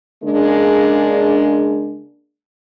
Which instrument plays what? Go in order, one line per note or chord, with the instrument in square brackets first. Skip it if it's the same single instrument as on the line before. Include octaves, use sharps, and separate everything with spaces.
[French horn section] C#3 G#3 A#3 D4